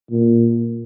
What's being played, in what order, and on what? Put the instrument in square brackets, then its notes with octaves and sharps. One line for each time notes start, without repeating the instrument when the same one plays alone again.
[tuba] A#2